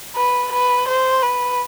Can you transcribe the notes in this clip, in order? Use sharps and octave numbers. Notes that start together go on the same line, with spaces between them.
B4
B4
C5
B4